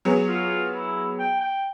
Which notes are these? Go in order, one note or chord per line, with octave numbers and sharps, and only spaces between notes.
F#3 B3 G#4
F4
E4
G5
G5